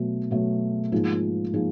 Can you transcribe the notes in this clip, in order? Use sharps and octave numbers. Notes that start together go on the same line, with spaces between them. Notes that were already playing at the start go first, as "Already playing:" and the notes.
Already playing: B2 F#3 A3
B2 F#3 A3
G#2 F3 A#3 D#4 G#4
F3 A#3 D#4 G#4